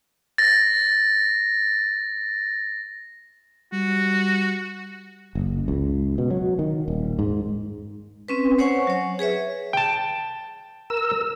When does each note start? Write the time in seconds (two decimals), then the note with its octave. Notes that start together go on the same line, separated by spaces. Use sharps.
0.38 A6 A#6
3.73 G3 F#4
5.35 F#1
5.68 C#2
6.18 B2
6.30 F#3
6.59 D#3
6.88 D#1
7.19 G#2
8.28 C4 C#4 B4
8.59 C5 C#5 F#5 G#5 C#6
8.87 F#3 C#5
9.19 G#4 B4 C#5 E5
9.73 G5 A5
10.90 A#4 E6